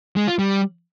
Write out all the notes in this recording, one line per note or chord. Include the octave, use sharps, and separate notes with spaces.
G#3
F4
G3